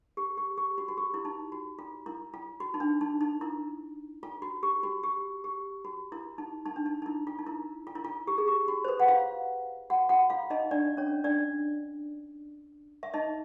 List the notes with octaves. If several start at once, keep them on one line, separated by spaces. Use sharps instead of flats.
G4
G4
G4
F#4
F#4
G4
E4
D#4
F#4
F4
E4
F4
F#4
D#4
D4
D#4
D#4
E4
F4
F#4
G4
F#4
G4
G4
F#4
E4
D#4
D#4
D4
D#4
D#4
E4
F4
D#4
E4
F4
E4
F4
G4
G#4
G4
F#4
C5
B4
F#5
F4 F5
F#4 F#5
F#4 F#5
F4 F5
D#4 D#5
D4 D5
C#4 C#5
D4 D5
E5
D#4 D#5